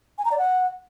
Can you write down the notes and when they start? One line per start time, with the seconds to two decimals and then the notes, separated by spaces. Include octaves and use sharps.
0.18 G#5
0.25 A#5
0.32 D5
0.38 F#5